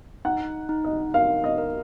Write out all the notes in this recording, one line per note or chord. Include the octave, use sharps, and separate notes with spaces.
D#4 F#5
D#4
D#5
A#4 F5
D#5
A#4